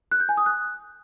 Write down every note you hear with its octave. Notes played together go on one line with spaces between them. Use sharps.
F#6
G6
G#5
D#6
F#6